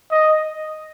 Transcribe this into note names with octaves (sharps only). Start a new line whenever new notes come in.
D#5